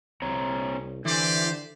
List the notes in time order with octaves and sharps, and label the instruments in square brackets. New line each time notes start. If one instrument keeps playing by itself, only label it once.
[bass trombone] C2 [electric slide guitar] C4 C#5 A#5
[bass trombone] D3 [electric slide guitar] E3 [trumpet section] G4 C5 D5